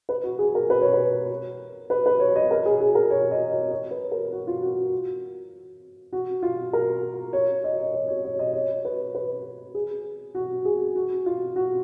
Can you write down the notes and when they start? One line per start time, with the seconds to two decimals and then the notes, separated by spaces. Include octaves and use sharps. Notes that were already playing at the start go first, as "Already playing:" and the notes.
0.09 B4
0.24 F#4
0.39 G#4
0.55 A#4
0.70 B4
0.81 C#5
0.93 B4
1.90 B4
2.06 B4
2.20 C#5
2.36 D#5
2.51 A#4
2.66 G#4
2.80 G#4
2.95 A#4
3.10 C#5
3.31 D#5
3.52 C#5
3.71 C#5
3.91 B4
4.12 A#4
4.32 F#4
4.47 F4
4.62 F#4
6.13 F#4
6.43 F4
6.73 A#4
7.33 C#5
7.64 D#5
7.94 C#5
8.08 C#5
8.24 C#5
8.39 D#5
8.53 C#5
8.85 B4
9.15 B4
9.75 G#4
10.35 F#4
10.65 G#4
10.96 F#4
11.26 F4
11.56 F#4